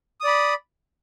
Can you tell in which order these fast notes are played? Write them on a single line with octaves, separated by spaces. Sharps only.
D#6 D5 B5